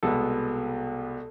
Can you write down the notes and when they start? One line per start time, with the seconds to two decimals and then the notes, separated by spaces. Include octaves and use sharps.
0.03 C2 B2 G#3 B3 A4